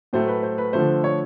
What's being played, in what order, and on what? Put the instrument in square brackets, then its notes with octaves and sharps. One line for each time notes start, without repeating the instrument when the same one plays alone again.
[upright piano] A2 F#3 A3 C5
B4
C5
B4
D3 F3 A3 C5
C#5